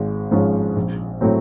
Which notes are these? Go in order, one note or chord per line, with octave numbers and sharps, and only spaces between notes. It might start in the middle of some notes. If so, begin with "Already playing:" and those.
Already playing: G#1 G#3
G#2 F3 G#3 C#4
A#1
A2 F#3 A3 C4